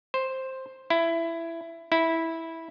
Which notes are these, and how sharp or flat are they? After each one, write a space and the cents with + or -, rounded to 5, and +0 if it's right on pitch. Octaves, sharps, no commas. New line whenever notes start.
C5 +5
E4 +15
E4 -10